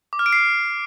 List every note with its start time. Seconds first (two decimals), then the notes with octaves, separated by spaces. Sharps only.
0.13 D6
0.19 F6
0.26 D7
0.33 C7